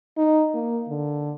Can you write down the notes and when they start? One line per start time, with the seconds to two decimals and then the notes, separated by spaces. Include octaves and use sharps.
0.18 D#4
0.54 A#3
0.89 D3